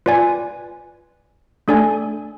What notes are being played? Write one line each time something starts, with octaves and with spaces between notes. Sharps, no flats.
F4 B4 D5 G#5
A3 D4 A4 D5 G#5